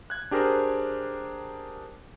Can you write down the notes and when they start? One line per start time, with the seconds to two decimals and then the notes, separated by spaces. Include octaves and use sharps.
0.10 F#6 G#6
0.31 D4 G4 G#4 A#4 C5